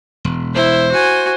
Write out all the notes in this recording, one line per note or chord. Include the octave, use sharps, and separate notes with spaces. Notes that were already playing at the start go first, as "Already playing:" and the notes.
E1
E4 C5
F#4 G#5